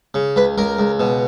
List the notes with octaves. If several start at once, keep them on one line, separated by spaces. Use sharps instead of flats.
C#3
C#2 B4
C#2 A#4
C#2
B2